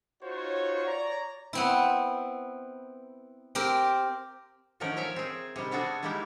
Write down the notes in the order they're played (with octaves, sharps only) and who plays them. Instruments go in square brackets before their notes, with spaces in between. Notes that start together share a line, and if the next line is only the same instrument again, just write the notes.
[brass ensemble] D#4 F4 F#4 C5 C#5
C#5 D5 A#5
[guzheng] B3 C4 E4
C4 G4 A#4
[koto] D3 D#3 F3 A3 C#4 A#4
A#4 C#5 E5 G#5
C4 G#4
C3 D#3 G3
B3 D4 F#4 G#4 A4
G3 G#3 A#3 D#4 E4 G4